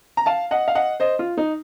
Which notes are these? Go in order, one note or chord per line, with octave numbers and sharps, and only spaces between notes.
A#5
F5 A5
D#5 F#5
F5
D#5 F#5
C5 D#5
F4
D#4